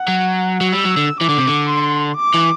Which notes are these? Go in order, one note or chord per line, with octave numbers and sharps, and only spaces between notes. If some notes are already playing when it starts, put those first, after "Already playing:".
Already playing: F#5
F#3
F#3
G3 E6
F#3
D3
E3 D6
D3
C3
D3
C6
D6
E3